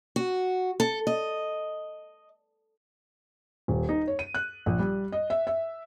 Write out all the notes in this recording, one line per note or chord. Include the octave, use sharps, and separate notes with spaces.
F#4
A4
D#5
D#1
D#4
C#5
D#7
F#6
A#1
G3
D#5
E5
E5